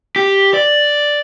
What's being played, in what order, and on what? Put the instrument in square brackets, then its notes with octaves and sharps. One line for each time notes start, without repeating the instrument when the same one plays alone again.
[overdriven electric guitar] G4
D5